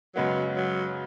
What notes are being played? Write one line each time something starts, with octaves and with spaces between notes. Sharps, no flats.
F#2 C#3 F#3 G#3 B3
F#3